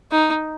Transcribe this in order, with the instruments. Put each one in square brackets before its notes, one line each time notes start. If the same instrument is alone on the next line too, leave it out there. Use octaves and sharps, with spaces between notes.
[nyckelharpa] D#4